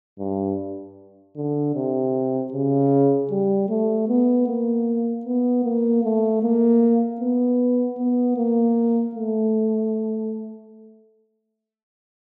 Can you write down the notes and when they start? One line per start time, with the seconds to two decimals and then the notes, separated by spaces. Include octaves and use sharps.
0.19 G2
1.36 D3
1.75 C3
2.53 C#3
3.31 G3
3.69 A3
4.09 B3
4.47 A#3
5.25 B3
5.64 A#3
6.04 A3
6.43 A#3
7.21 B3
7.98 B3
8.37 A#3
9.15 A3